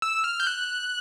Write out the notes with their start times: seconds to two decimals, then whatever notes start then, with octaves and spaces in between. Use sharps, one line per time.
0.02 E6
0.24 F6
0.40 G6
0.47 F#6